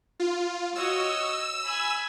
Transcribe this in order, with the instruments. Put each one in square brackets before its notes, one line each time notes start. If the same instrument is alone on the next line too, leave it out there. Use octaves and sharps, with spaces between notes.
[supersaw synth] F4
[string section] F#4 C#5 D#5 [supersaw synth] E6
[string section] G#5 B5